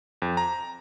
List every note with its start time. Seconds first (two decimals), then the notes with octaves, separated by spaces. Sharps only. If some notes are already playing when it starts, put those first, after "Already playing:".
0.22 F2
0.37 A#5